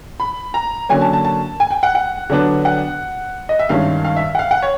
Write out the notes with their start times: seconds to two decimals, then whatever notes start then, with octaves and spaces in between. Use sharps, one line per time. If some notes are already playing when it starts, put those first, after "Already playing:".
0.20 B5
0.54 A#5
0.89 D3 F#3 A#3 C#4 G#5
1.01 A5
1.13 A5
1.25 A5
1.60 G#5
1.70 G5
1.83 F#5
1.95 F#5
2.30 D3 F#3 B3 D4
2.65 F#5
3.49 D#5
3.59 E5
3.69 G2 D#3 G#3 C#4 F5
4.04 F5
4.16 E5
4.35 F#5
4.39 F5
4.51 F#5
4.62 C#5